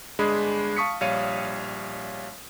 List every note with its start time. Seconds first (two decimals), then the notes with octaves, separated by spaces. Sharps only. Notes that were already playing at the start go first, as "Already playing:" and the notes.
0.19 G1 G#3 D4 G#4 B5
0.77 F5 A5 C#6 D#6 B6 C#7
1.01 A#1 G3 C#5 F5 C#7 D#7